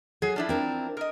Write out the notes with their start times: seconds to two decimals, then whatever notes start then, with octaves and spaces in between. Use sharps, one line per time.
0.22 F#3 G#4
0.36 F3 D4 E4
0.49 C4 A#4
0.97 A#4 D#5